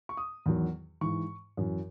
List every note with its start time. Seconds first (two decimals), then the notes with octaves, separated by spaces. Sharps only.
0.09 C#6
0.17 D#6
0.46 E2 D#3 F#3
1.01 G#2 E3 C#6
1.57 F#2 E3